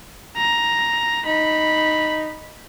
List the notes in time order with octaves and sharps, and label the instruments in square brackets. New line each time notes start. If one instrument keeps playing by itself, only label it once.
[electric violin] A#5
[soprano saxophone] D#4 [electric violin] B5